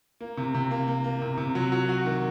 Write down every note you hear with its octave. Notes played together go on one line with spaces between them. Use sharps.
A#3
C3
C3
A#3
A#3
A#3
C3
C3
F#3
F#3
F#4
D#3